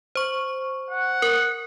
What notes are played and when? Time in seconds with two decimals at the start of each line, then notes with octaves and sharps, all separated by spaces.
0.15 C5 C#6
0.91 F#5
1.22 A#4